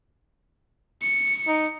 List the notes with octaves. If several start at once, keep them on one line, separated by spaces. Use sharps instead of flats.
C#7
D#4